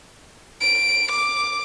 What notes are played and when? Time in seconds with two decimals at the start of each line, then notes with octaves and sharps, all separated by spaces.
0.62 D7
1.12 D6